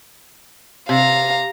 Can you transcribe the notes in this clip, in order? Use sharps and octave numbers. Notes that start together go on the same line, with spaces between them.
C3 F5 A#5